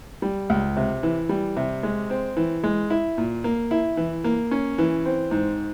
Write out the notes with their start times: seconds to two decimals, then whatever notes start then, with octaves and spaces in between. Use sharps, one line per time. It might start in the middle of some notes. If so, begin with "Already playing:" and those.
0.22 G3
0.50 C#2
0.77 C3
1.03 E3
1.29 G3
1.57 C3
1.83 G#3
2.10 C4
2.37 E3
2.64 G#3
2.90 E4
3.18 A#2
3.44 A#3
3.71 E4
3.97 E3
4.24 A#3
4.51 C#4
4.78 E3
5.05 C4
5.31 G#2